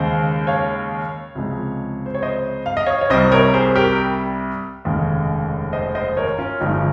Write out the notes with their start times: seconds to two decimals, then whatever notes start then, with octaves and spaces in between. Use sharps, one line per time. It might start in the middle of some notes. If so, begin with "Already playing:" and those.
Already playing: D#2 C#3 G#3 C5
0.47 C#5 F5
1.35 C#2 C3 F3 G#3
2.06 C5
2.15 C#5
2.22 C5 D#5
2.66 F5
2.77 D#5
2.86 C#5 F5
3.01 C#5
3.10 C2 C3 G3 C5 D#5
3.32 A#4 C#5
3.54 G#4 C5
3.75 G4 A#4
4.85 F1 D#2 C#3 G#3
5.72 C5 D#5
5.95 C5 D#5
6.17 A#4 C#5
6.38 C#4 F4
6.60 G1 G2 F3 G#3 D#4
6.69 C#4